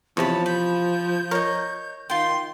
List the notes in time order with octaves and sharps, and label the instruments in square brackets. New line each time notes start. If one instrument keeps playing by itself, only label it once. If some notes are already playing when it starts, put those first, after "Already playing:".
[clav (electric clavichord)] E2 C3 [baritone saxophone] F3 [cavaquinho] C#5 B5 [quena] A5
[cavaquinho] B5 [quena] G6
[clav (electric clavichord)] A#4 [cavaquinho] C#5 D#5
[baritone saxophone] D#3 [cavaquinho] F4 G5 [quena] C6